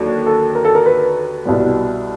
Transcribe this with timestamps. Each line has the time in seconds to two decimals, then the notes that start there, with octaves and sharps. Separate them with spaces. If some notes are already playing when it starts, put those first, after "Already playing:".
Already playing: D#2 D3 F#3
0.26 A4
0.55 A#4
0.65 A4
0.75 A#4
0.86 B4
1.45 C2 B2 G3